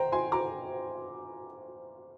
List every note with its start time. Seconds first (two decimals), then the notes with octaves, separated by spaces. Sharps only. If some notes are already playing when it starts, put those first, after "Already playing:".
Already playing: C5 G5 A#5
0.12 G#5 C6
0.32 A#5 D6